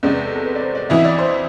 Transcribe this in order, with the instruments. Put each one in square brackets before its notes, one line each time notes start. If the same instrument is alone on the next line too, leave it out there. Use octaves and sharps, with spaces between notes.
[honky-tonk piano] E2 C3 G#3 [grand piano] D5
[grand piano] B4
A4
A4
B4
D5
C5
D5
[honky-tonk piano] F2 E3 B3 E4 [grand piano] E5
[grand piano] D5
C5